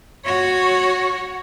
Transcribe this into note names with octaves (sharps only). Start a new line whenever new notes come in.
F#4 C#5